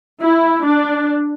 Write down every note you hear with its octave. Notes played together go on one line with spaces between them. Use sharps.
E4
D4